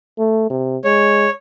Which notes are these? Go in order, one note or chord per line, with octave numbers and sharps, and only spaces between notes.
A3
C3
G#3 C#5